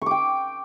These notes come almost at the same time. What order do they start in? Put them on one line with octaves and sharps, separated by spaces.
C#6 D6 G5